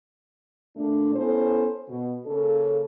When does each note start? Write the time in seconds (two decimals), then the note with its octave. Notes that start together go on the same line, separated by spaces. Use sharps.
0.77 A#2 A3 D4
1.15 B3 C#4 E4 A4 C5
1.88 B2
2.26 C#3 A#3 C#4 A4